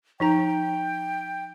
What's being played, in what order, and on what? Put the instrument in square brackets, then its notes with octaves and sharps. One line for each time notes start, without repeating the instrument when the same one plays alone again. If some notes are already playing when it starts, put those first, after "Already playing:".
[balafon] F3 D#4 A#5 [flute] G5